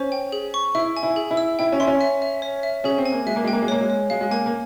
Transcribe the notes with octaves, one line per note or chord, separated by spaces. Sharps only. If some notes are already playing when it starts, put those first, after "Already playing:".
Already playing: C#4 C5
G5
G#4
C#6
E4 E5
G#5
E4
G#4
E4
E6
E4 G5
C#4
E4 C6
C#4
E5
E5
C#5
E5
C#4 G#4
C4
G#5
A#3
G#3 E5
A#3
G#3 G5
A#3
G#3
A#3 C#5
G#3
C#5
G#3 F5
G#3
A#3 G#5
A#3